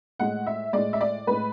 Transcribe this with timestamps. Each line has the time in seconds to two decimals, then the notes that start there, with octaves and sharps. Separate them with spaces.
0.20 A2 G#3 F#5
0.47 E5
0.73 A2 G#3 D5
0.93 E5
1.01 D5
1.27 A2 G#3 B4